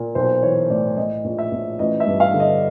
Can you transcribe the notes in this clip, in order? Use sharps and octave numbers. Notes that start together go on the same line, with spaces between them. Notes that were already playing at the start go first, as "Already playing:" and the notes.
Already playing: A#2
B1 C5
E3 C#5
A2 D5
A2 D#5
A#1
E5
A#1
A1 D#5
E5
G2
F5
D3
D#5